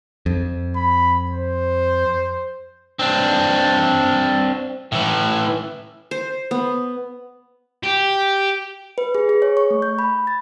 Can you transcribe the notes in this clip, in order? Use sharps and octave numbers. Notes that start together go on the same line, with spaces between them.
F2
B5
C5
C4 D4
A2 E3
C5
B3
G4
B4
G#4
G#4
C#5
C#6
A3
G6
B5
A6